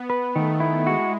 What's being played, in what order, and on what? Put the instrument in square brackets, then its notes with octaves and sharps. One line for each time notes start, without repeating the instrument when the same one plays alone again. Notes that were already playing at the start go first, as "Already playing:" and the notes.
Already playing: [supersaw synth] B3
[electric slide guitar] B4
[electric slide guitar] D#3 [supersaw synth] A3
[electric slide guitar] E4
[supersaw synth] G#3 [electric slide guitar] F#4